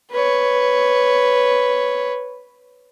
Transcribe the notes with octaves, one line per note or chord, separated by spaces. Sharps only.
B4 C#5